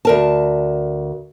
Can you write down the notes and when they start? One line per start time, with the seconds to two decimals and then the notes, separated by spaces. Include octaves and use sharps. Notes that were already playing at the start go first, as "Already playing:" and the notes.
0.05 D2 A#4 A5